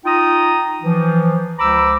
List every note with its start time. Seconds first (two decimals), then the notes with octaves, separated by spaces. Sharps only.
0.05 D#4 F4 G5 A#5 D#6
0.82 E3 F3
1.58 C#2 C5 A#5 B5 D6 E6